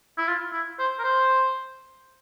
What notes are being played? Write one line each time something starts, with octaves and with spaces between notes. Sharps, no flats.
E4
F4
E4
C5
A#4
C5